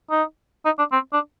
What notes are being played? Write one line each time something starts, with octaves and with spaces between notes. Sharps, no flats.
D#4
D#4
D4
C4
D4